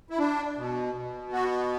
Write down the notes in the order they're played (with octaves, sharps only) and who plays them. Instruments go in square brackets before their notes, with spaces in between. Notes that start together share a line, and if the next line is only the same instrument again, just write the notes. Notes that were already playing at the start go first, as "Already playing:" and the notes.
[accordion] E4
D4
B2
B2
B3 F#4